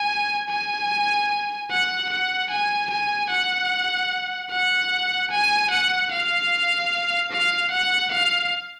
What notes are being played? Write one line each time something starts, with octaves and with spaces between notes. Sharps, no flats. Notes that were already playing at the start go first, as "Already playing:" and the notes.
Already playing: G#5
G#5
F#5
F#5
G#5
G#5
F#5
F#5
G#5
F#5
F5
F5
F#5
F5